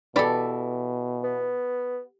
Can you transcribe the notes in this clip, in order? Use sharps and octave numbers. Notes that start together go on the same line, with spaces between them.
B2 E3 G4 A4 D5 B5
B3